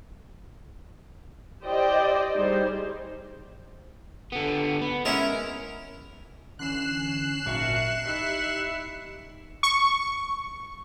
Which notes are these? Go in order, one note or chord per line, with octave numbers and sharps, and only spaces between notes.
E4 G4 C5 D5 D#5 G5
G3 D#4 G#4 C5
D3 B3
B3
G#3 C#4 E4 A#4
D3 E3 C#4 F#6 C7 E7
G#1 A#2 F#3 A#4 E5 A5 C#6
D#4 E4 G4 D#5 E5 C#6
C#6